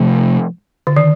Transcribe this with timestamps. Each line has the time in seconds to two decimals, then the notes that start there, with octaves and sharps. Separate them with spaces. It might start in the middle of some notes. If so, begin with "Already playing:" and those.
Already playing: C3 F3 A3
0.87 D3
0.97 D#3